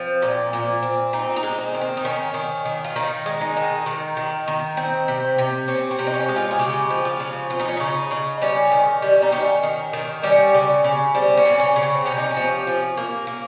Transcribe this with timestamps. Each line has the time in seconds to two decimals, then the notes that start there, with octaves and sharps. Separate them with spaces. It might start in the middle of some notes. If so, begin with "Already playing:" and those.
Already playing: F3 C4
0.22 A#2
0.53 A#2
0.83 C4
1.13 C4 D#4
1.36 D#4
1.43 G#3
1.58 C4
1.74 D#3
1.81 C4
1.97 D#4
2.05 D#3 C#4
2.34 D#3
2.65 D#3
2.84 F4
2.96 D#3 D#4
3.26 G#3
3.41 D#4
3.57 D#3
3.86 D#3
4.17 D#3
4.48 D#3
4.77 C4
5.08 C3
5.38 C3
5.68 C4 C#4
5.91 C4
5.99 C3
6.07 D#4
6.14 C#4
6.29 G#3
6.36 F4
6.51 G#4
6.59 C#3 G4
6.90 F3
7.05 F4
7.20 C#3
7.50 C4 F4
7.59 D#4
7.68 C#4
7.77 C#3 D#4
8.11 C#3
8.42 G3 C#4
8.72 D#3
9.02 G3
9.22 D#4
9.32 D#3 C#4
9.63 D#3
9.93 D#3
10.23 G3 C#4
10.54 C#3
10.84 C#3
11.15 G3 C4
11.37 C#4
11.46 C#3
11.60 C#4
11.76 C#3
11.83 C4
12.05 C3 C#4
12.18 D#4
12.30 C#4
12.37 F3
12.67 F3
12.97 A#3
13.27 A#3